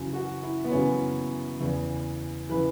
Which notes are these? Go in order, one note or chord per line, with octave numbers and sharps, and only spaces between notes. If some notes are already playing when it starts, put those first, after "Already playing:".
Already playing: F#2 C#3 E3
F#4
E4
B3
F#2 C#3 E3 C#4
E2 C#3 E3
C#3 E3 B4